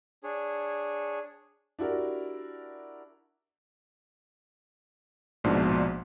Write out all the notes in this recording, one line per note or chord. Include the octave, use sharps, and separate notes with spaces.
D4 G#4 C#5
D4 E4 F#4 G4 A#4
A#1 G#2 B2 F3 D4